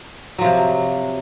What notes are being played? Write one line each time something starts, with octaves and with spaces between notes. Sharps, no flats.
C3 F3 F#3